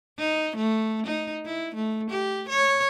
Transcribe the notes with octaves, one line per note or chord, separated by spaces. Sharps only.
D#4
A3
D#4
E4
A3
G4
C#5